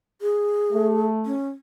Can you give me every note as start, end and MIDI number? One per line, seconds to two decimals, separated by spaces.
0.22 1.04 68
0.72 1.32 57
1.26 1.49 61